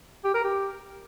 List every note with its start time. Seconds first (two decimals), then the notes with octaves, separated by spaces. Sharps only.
0.24 G4
0.34 A#4
0.45 G4